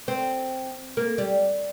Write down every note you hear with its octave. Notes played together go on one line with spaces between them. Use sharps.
C4
A#3
G3